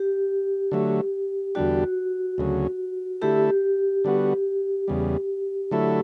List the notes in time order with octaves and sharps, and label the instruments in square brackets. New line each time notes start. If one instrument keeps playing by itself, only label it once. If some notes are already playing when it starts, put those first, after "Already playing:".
Already playing: [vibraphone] G4
[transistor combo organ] D3 F#3 A3
[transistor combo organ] E2 D3 G3 D4 G4 [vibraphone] F#4
[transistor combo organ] D2 C#3 F#3
[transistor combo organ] D3 A3 E4 A4 [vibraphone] G4
[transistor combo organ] D3 G3 B3 F#4
E2 C#3 G3
D3 F#3 A3 E4 A4